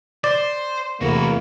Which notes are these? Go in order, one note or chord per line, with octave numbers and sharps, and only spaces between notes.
C5 D5
E2 C3 A3 A#3 E4 F#4